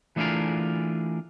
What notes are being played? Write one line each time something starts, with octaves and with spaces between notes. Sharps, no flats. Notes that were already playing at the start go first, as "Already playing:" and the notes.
E3 A3 D4 F4 G#4 A#4